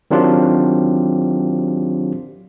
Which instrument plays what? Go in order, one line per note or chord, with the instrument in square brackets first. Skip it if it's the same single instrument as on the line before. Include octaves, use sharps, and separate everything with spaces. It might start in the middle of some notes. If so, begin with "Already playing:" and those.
[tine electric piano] D#3 F#3 C4 D4 F4 G4